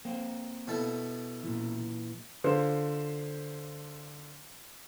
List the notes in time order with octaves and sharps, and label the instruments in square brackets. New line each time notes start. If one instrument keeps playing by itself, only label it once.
[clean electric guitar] A#3 C4
[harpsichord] B2 E4 A4
[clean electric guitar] A#2 E3
[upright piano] D3 F4 C5